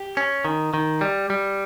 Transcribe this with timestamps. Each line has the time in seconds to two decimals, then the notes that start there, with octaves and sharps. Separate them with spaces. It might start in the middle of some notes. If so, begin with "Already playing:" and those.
Already playing: G4
0.17 C#4
0.45 D#3
0.74 D#3
1.01 G3
1.30 G3